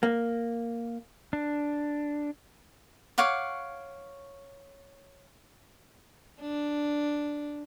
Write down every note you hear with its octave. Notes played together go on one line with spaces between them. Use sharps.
A#3
D4
C#5 F5 F#5 D6
D4